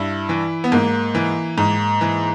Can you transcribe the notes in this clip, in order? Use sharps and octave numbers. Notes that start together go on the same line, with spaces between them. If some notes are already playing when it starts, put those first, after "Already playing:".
Already playing: G2 E4
E3
B3
G#2 A#3
E3
G#2
E3